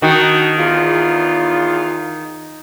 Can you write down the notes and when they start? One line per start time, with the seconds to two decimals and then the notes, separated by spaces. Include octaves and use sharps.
0.02 D#3 D4 D#4 F#4
0.59 E2 F4